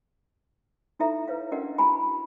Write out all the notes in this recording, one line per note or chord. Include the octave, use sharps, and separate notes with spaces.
D#4 E4 A4 E5 A#5
B4 C#5 F5
C#4 D4 F#4 A#4 D#5 F#5
E4 F#4 G#5 B5